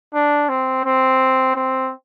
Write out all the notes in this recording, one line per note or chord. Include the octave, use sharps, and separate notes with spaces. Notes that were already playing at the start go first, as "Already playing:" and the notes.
D4
C4
C4
C4